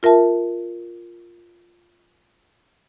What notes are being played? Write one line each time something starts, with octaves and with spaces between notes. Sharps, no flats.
F4 A#4 E5 A5